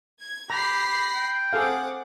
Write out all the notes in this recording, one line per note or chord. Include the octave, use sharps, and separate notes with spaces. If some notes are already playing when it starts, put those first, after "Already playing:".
G#6
G4 A#5 B5 A#6 C7
G4
G5
C4 G#4 A4 F5 F#5 D6